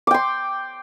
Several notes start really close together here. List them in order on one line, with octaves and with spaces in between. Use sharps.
D6 G5 C6